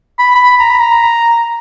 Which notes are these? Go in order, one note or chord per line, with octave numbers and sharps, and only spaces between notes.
B5
B5
A#5
B5
A#5